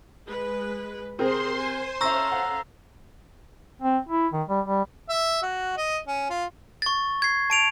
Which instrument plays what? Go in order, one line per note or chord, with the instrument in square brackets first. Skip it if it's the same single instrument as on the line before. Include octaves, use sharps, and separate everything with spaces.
[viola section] G#3 B4
[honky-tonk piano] C3 C4 A#4 [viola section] G#4 [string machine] C5 C6
[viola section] G#5
[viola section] C#4 A4 F5 [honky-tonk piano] E5 C#6 [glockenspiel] A#5 E6 A#6
[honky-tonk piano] F#5
[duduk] C4
E4
D#3
G3
G3
[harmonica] E5
F#4
D#5
C#4
F4
[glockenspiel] C#6 A6
G#6 C7
A5 D7 F7